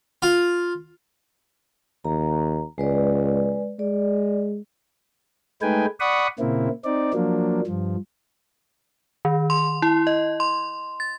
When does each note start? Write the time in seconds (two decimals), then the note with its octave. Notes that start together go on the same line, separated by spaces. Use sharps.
0.22 F4
2.05 D#2 A#5
2.78 C#2 G#3 B4 D5
3.79 G#3 D5
5.62 G#3 A3 D#4 B4 G5 G#5
6.00 D5 F#5 B5 C#6 D#6
6.39 A#2 C#3 A#3 C4 E4
6.85 C4 D#4 D5
7.13 F3 F#3 A#3 D4
7.67 G2 F3
9.25 D#3
9.50 C6
9.82 E4
10.07 D#5
10.40 C6
11.00 A6